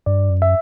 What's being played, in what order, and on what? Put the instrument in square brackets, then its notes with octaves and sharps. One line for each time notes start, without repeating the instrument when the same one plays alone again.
[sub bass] G2 [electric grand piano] D5
[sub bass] F#2
[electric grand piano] E5